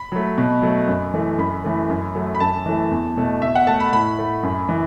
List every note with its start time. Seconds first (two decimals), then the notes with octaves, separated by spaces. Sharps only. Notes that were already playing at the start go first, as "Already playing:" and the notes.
Already playing: B5
0.12 F#3 A3
0.38 B2
0.62 F#3 A3
0.87 F#2
1.14 E3 A3
1.38 F#2 B5
1.64 E3 A3
1.90 F#2
2.15 F#3 A3
2.35 B5
2.40 F#2 A5
2.66 E3 A3
2.91 E2
3.17 B2 A3
3.42 B2 E5
3.55 F#5
3.67 A3 A5
3.80 B5
3.92 A2 B5
4.19 A3
4.43 F#2
4.69 E3